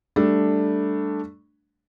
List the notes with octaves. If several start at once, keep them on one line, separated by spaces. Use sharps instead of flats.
G3 A3 D4